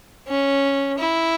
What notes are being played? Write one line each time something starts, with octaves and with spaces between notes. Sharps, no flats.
C#4
E4